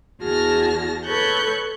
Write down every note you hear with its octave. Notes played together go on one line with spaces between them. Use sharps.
E2 F#4 G#4 A5 F6 A#6
A4 B4 C#5 C#6 F#6 G6